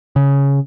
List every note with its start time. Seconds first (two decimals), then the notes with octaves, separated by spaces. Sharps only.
0.16 C#3